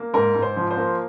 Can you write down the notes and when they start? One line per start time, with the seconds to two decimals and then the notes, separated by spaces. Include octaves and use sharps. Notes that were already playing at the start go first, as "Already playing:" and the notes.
Already playing: A#3
0.14 G#2 A#4
0.35 G#2
0.42 C5
0.56 F3
0.71 C5
0.77 A#3